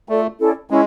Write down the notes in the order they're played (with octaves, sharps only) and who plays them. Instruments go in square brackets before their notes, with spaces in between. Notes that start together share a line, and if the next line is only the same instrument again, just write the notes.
[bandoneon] A3 [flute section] F4 A4 D5
[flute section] C#4 E4 A4 D5
[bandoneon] G#3 [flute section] C#4 E4